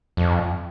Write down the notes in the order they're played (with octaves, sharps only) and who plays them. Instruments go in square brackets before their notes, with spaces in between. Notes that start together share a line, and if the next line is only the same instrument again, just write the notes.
[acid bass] F2